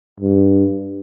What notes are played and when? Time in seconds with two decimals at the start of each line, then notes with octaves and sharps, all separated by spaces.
0.20 G2